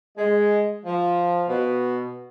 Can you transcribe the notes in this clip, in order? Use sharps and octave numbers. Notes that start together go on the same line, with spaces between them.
G#3
F3
B2